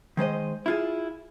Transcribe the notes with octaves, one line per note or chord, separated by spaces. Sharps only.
D#3 G#3 C5 D#5
E4 F4 G#4